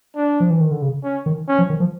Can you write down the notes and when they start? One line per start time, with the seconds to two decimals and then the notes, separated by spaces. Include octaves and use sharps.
0.16 D4
0.40 F3
0.50 E3
0.61 D#3
0.71 D3
0.82 C#3
1.04 C#4
1.26 D#3
1.48 C#4
1.59 F3
1.70 D#3
1.80 F3